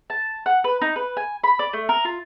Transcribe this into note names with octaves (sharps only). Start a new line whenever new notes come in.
A5
F#5
B4
D#4
B4
G#5
B5
D5
A3
A#4
F4